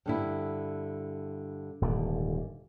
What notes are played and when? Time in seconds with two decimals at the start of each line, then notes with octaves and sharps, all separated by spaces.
0.06 G2 D3 E4
1.82 D#1 G#2 D3